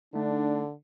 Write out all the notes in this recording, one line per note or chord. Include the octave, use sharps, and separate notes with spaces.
D3 A3 D4 D#4